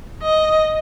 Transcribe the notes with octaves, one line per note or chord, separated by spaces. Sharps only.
D#5